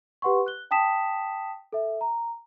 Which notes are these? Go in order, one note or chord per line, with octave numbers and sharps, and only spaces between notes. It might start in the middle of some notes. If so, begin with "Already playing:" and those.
G4 B4 F#5 C6 C#6
F#6 G7
G5 A5 D#6 B6 E7
A4 E5
A#5